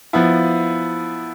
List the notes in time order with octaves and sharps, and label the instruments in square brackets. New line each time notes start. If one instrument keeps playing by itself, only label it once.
[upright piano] F3 B3 E4